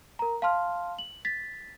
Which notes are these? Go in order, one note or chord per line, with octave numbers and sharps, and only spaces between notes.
A#4 A#5
F5 A5 C6 F6
F#7
A6 B6